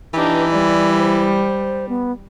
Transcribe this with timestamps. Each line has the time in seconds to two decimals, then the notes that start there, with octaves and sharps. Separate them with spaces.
0.14 E3 D4 D#4 G4 B4
0.50 G3 D5
0.97 C5
1.89 B3